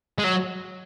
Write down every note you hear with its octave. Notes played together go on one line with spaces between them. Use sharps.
G#3
F#3